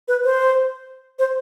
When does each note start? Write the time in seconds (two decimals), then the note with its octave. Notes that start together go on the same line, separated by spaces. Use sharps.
0.08 B4
0.24 C5
1.19 C5